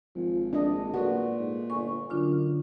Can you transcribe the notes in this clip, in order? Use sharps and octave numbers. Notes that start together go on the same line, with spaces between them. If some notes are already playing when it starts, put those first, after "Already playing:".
G#1 F3
A#1 D4 D#5
A#2 F#4 A4 B4 D5
G#2
G1 G#5 C#6
F#2 D3 D4 F4